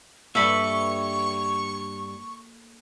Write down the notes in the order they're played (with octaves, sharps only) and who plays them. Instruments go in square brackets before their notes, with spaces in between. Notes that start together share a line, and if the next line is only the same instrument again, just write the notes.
[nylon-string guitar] G2 G3 [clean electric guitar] A#3 A4 B4 [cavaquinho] E5 B5 [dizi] C#6